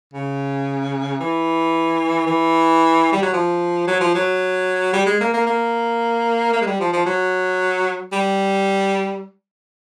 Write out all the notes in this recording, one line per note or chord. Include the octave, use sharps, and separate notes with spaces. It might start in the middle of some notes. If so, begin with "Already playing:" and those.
C#3
E3
E3
G3
F#3
F3
F#3
F3
F#3
G3
G#3
A#3
A#3
A#3
A#3
G#3
G3
F3
F3
F#3
G3